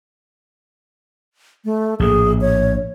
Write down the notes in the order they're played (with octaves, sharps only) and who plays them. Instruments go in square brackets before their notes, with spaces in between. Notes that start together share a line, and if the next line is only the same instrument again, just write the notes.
[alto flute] A3
[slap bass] A#1 A2 [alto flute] G#4
[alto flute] C#5